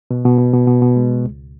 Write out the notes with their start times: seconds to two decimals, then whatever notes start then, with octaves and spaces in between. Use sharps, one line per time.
0.11 B2
0.25 B2
0.38 B2
0.53 B2
0.67 B2
0.81 B2
0.96 G#3
1.10 G#3
1.25 C#2